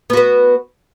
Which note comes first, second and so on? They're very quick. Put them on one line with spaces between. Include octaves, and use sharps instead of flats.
B3 F#4 B4